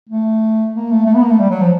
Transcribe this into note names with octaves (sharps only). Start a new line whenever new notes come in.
A3
A#3
A3
A3
B3
A#3
A3
G3
F#3
F3